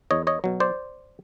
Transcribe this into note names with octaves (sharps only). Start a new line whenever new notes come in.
E2 C#5 D#5
C#5 D#5
B2 F#3
C5 D5